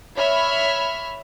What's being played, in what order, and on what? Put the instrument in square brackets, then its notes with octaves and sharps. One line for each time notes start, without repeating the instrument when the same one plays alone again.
[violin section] C#5 E5 B5 F6